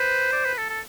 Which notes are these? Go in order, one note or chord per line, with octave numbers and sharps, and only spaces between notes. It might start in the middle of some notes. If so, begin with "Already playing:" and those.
Already playing: B4 C5
D5
B4
A4
A4